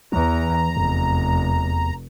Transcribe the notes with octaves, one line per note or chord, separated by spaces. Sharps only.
E2 E3 A#5
F1 E2